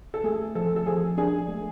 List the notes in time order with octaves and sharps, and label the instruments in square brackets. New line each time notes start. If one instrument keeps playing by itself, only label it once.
[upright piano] A4
[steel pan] A3 [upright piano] G#4
[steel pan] F3 [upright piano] A4
[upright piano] A4
[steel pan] F3 [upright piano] G#4
[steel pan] D4 [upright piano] G#4
[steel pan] A3